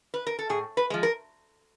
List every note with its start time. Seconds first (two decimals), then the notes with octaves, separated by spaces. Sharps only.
0.14 B4
0.27 A#4
0.39 A4
0.49 A2 G#4
0.77 B4
0.90 F3 G#3
1.03 A#4